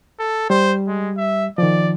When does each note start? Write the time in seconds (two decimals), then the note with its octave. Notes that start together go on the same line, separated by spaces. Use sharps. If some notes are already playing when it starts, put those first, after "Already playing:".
0.20 A4
0.50 G3 C5
0.87 G#3
1.17 E5
1.58 D#3 F3 D5